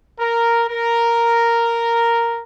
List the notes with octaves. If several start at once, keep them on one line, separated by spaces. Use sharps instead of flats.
A#4
A#4